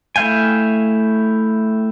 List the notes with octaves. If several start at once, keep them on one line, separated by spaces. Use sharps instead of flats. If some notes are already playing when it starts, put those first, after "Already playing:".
A3 E4 F5 G5 G#5